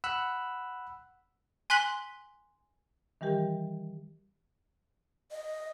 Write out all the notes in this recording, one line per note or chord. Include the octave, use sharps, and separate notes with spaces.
F#5 B5 E6 F#6
G#5 C6 F#6 B6 F#7 G7
D#3 E3 G3 G4 A#4
D#5